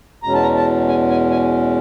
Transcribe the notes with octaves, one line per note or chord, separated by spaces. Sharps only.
E2 B2 G#3 C#4 A#5
A5
A#5
A5
G#5
G#5
G#5